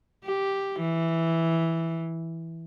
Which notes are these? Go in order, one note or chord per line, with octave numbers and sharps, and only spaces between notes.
G4
E3